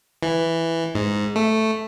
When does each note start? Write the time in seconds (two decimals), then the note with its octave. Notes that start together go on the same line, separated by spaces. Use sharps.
0.23 E3
0.95 G#2
1.36 A3